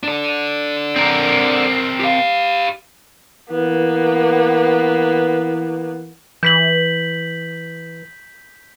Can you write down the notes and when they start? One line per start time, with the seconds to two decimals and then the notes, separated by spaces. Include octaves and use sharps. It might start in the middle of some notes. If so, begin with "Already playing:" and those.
0.03 D4 A4
0.96 C4 A#4
2.00 G4 F5
3.51 E3 A#3 B3
6.43 E3 G6 B6 F#7